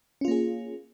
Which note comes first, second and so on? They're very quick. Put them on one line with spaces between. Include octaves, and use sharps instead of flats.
C#4 F4 A#3 G#4